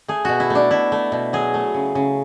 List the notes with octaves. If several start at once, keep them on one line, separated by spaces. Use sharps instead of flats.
A3 G#4
B2 F#4
E4
A3
D4
B2 E4
A3
B2
F#3 G#4
A3
C#3
C#3